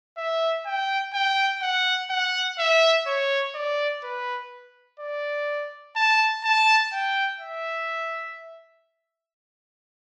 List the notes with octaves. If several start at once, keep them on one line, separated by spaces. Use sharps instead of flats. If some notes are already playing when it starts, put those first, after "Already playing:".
E5
G5
G5
F#5
F#5
E5
C#5
D5
B4
D5
A5
A5
G5
E5